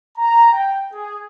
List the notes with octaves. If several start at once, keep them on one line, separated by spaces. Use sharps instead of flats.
A#5
G5
G#4